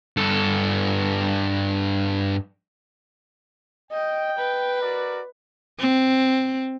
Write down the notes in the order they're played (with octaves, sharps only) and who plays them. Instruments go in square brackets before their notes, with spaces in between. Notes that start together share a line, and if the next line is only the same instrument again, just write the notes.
[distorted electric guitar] G2 A4
[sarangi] D#5 [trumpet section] G5
[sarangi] B4
[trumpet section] F#4 A#4 D5
[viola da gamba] C4